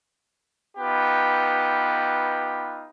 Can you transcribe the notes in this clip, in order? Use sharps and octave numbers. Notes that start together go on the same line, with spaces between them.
B3 D#4 F4 G4 B4